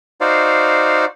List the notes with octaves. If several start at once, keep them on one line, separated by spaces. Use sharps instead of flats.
D#4 F#4 C5 D5 F5